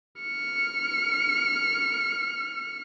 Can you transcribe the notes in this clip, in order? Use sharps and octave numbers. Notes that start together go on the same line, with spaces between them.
F6 C#7